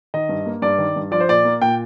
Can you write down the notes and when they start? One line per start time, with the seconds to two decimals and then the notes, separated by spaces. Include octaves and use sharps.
0.14 D#3 D#5
0.29 G2
0.46 A#3
0.62 G2 D5
0.78 D#3
0.96 G2
1.11 F3 D5
1.20 C5
1.29 A#2 D5
1.45 A#3
1.61 A#2 G5